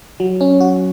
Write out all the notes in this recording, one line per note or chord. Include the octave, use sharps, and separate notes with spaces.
F#3
C#4
F#4